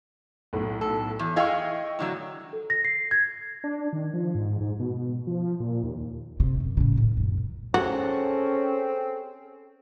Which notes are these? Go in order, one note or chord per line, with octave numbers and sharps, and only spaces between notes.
B1 A2
A4
E2
E4 G#4 D#5 F5 G5 C#6
A2 D3 F#3
A4
A#6
C7
G#6
D4
D#3
F3
G#2
G#2
B2
F3
A#2
D#2
C3
F#2 B2
A2 C#3
D#2 A2
F#2 A#2
C4 C#4 F#4 G#4 A4 F#5